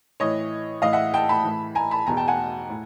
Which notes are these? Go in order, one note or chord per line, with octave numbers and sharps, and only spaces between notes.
A2 E3 C#5 D#5
A2 E3 D#5 F5
E5 F#5
G5 A5
A5 B5
A2 E3
G#5 A#5
A5 B5
E2 B2 G#5 A#5
G5 A5
F#5 G#5
A2